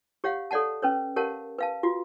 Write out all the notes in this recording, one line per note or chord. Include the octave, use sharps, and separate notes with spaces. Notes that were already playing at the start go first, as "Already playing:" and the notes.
G4 C#5 F5 F#5
A4 C#5 D5 F#5 A5
C#4 B4 C#5
G4 A#4 C#5 F5 F#5 A5
B4 F5 A5
F4 F#4